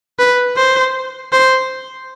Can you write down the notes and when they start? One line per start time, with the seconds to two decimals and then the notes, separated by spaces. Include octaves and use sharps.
0.19 B4
0.56 C5
1.33 C5